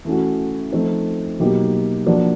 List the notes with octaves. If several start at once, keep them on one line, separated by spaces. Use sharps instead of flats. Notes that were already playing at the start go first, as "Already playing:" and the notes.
E3 A3 C#4 F#4
F3 A3 C4 D#4
B2 F#3 A#3 D#4 G4
F3 A#3 D4 F#4